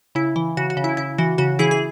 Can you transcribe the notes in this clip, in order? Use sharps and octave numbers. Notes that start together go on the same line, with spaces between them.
C#3 E4
E3
C#3 F#4
F#4
C#3
E4
C#3 E4
E3 F#4
C#3 F#4
E3 E4 G#4
G#4